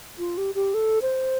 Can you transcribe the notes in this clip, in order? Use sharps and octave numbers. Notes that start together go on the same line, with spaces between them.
F4
G4
G4
A4
C5